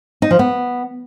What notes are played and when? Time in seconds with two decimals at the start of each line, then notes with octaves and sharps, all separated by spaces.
0.22 D#4
0.31 F3
0.39 B3